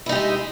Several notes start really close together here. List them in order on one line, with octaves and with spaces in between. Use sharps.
E4 D#4 G4 G#3